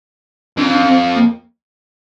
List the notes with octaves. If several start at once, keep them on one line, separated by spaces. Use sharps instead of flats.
F2 D4
D4
C4
A#3